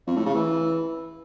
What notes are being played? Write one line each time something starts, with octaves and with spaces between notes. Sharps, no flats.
F2
A2
C#3
E3